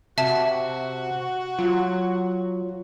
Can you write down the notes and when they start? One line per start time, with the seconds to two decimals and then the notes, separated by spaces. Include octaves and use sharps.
0.18 C3 F#4 E5 A5
1.59 F#3 F4